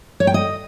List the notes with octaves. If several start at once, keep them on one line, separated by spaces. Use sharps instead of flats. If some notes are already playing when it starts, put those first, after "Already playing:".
C#5
G5
D#5